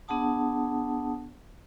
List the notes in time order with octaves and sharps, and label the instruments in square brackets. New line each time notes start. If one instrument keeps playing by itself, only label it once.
[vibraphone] B3 D4 G#4 F#5 A5 D#6